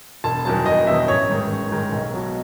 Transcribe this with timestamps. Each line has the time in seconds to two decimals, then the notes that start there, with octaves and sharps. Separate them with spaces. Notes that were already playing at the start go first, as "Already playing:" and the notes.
0.24 E1 A5
0.45 E2 D#3 F#3 A5
0.66 E1 D#5
0.87 E2 D#3 F#3 E5
1.08 A1 C#5
1.29 G#2 D#3 G#3
1.50 A1
1.71 G#2 D#3 G#3
1.92 B1
2.14 B2 F#3